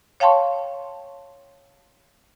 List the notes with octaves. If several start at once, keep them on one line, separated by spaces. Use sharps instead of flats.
C#5 F5 G5 A5 C6 C#6